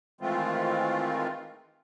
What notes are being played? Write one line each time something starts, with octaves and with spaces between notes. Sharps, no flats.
D#3 E3 G#3 A3 C4 F4